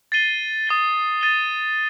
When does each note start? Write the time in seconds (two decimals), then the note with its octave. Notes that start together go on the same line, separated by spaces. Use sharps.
0.12 A6 C7 D#7 G7
0.67 D#6 A6 D#7 G7
1.21 A6 D#7 G7